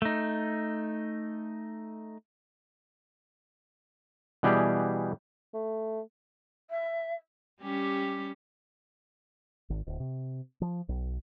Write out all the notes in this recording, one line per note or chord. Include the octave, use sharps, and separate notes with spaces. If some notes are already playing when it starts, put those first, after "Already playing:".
A3 D#4
B2 E3 G3 G4 G#4
A3
E5
G3 C#4 G4
G#1
D1
C3
F3
B1